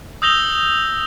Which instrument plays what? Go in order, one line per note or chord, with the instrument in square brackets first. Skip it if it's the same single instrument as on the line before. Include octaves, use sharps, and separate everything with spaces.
[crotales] D#6 E6 G6 A#6 F7 G7